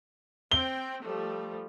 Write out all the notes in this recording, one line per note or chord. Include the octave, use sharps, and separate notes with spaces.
C4 G5 G7
F3 G3 A3